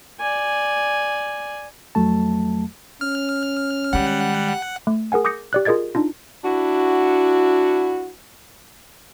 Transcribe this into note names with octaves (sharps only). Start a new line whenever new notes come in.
D5 G#5
F2 F#3 A3 A5
C#4 F6
D#3 G3 G#3 F#5
A3
G#4 A#4 F#5 G#5
D6 D#6 G6 A#6 C#7
G4 D5 F#6
F4 G#4 A#4 D#5 G#6 A6
D4 D#4 F4
D4 E4 F#4